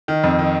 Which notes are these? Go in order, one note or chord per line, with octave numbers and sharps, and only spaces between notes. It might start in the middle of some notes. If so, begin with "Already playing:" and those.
D#3
F2
D#3